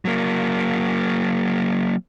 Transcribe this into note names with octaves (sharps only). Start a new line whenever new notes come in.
F#3 A#3